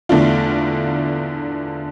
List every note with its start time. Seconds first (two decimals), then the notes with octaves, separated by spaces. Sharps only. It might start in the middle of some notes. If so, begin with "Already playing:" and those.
0.09 E2 D3 A3 D4 F4